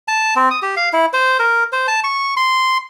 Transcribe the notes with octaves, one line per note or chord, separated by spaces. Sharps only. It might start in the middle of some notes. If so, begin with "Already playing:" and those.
A5
C4
D#6
G4
F5
E4
C5
A#4
C5
A5
C#6
C6